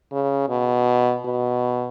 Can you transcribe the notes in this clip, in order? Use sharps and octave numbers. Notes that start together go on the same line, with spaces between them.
C#3
B2
B2